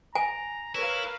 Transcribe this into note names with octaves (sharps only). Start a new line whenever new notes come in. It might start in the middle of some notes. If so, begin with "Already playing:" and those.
G#5 A#5
E4 A#4 B4 C#5 F5